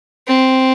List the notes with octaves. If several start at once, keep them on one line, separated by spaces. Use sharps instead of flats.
C4